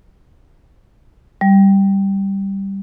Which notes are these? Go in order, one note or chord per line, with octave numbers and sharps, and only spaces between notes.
G3